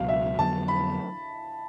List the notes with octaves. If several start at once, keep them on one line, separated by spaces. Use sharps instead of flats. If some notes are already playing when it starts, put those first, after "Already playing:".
Already playing: C#2 B2 F#3 F5
E5
F2 D3 F#3 B3 A5
B5